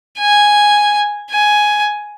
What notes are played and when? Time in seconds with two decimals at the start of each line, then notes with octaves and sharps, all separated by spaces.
0.19 G#5
1.30 G#5